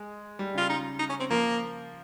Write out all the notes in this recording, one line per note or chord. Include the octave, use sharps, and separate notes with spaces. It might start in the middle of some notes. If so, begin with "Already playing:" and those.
Already playing: G#3
G3
C#3 F4
D#4
D#4
C#4
C4
F3 A#3